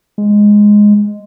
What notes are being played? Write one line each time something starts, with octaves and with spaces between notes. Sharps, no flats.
G#3